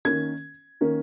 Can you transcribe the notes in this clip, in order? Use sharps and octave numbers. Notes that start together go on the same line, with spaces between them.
D#3 A#3 C#4 G#6
D#3 A#3 C#4